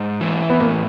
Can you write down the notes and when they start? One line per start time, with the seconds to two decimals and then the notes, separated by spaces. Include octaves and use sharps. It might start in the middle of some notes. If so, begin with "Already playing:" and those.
Already playing: G#2
0.21 E3
0.50 B3
0.60 A2 A#3